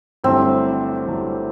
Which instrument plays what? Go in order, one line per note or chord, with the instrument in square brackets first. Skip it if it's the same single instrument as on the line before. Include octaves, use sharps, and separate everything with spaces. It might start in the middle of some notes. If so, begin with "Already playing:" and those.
[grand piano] G1 G2 F#3 A3 E4 [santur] C4
[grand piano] G1 G2 F#3 A3 E4